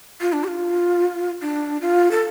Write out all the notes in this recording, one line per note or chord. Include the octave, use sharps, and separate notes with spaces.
F4
D4
G4
F4
D4
F4
A4